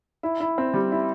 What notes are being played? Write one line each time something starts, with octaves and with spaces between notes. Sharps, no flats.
E4
E4
C4
G3
E4